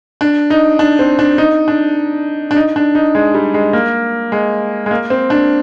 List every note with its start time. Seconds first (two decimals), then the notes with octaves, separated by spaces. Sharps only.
0.21 D4
0.50 D#4
0.79 D4
0.99 C4
1.19 D4
1.38 D#4
1.68 D4
2.51 D4
2.56 D#4
2.76 D4
2.95 D#4
3.15 G#3
3.35 G3
3.54 G#3
3.73 A#3
4.32 G#3
4.86 G#3
4.91 A#3
5.10 C4
5.30 D4